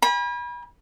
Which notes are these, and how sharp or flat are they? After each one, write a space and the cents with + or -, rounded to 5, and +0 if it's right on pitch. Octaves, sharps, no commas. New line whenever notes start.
G#5 -45 B5 -30